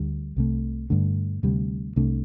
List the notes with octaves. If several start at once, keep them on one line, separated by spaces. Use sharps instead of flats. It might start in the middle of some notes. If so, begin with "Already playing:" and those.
Already playing: D2 D3 G3
C2 C3 A3
G2 D3 A3
D2 C3 G3
C2 C3 A3 D4